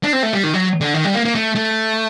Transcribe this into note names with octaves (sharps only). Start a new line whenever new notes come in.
D4
C4
A3
G3
D#3
F#3
D3
D#3
G3
A#3
A#3
A3
A3